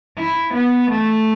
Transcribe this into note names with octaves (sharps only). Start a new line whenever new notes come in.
E4
B3
A3